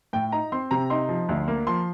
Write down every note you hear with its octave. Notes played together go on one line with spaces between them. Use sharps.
A2 G5
D#4 A#5
C4 C6
C3 A#5
D#4 C6
F3
D2
A#3
F3 C6